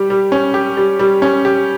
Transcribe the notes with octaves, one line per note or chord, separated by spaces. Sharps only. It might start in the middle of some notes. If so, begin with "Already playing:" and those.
Already playing: G3 G4
G3
C#4
G4
G3
G3
C#4
G4